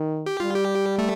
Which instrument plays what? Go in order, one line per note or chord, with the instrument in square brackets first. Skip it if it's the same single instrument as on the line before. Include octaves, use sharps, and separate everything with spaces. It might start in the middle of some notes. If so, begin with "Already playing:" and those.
Already playing: [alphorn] D#3
[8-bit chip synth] G4
[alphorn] G3 [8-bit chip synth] F4
[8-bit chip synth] G4
A3